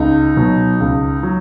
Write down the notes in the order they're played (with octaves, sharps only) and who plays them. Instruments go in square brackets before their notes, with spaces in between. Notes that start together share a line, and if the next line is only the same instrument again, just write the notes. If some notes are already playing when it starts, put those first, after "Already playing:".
Already playing: [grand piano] C#2 D#4
B2 F#3
C#2
F#3